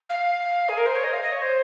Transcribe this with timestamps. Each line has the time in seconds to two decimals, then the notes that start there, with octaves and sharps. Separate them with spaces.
0.09 F5
0.68 G#4
0.77 A#4
0.86 C5
0.95 C#5
1.03 D#5
1.13 F5
1.22 D#5
1.32 C#5
1.41 C5